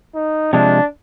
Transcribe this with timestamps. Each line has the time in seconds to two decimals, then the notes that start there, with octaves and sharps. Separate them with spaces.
0.15 D#4
0.53 C3 F3 G#3 D4